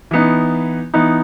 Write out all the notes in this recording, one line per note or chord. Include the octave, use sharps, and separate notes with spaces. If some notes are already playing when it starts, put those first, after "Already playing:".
E3 B3 D#4
E3 B3 D#4